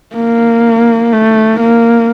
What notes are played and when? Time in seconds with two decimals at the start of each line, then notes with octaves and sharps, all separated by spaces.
0.16 A#3
1.13 A3
1.60 A#3